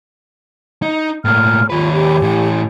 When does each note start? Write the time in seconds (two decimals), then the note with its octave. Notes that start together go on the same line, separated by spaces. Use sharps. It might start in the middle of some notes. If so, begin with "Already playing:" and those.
0.82 D#4
1.25 A2 A#3 F6
1.70 D#2 F4 B4
1.93 G4
2.22 A2 E3